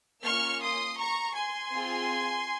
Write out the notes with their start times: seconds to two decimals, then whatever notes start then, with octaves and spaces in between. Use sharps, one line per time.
0.25 A#3 C#4 F4 C#6 F6
0.62 C6 D#6
0.99 A#5 C#6
1.36 G#5 C6
1.73 C4 F4 G#4